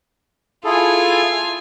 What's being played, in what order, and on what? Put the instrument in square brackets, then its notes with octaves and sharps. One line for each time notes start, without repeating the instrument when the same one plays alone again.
[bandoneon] E4 G#4 A4 [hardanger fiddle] F4 G#5